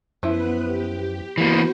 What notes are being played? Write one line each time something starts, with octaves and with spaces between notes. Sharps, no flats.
F#2 F3 B3 E4 B4
G4
E3 A#3 B3 F#4 C5